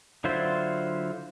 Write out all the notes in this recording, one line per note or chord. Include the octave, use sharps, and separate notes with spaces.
D3 F#3 E4 F4 C5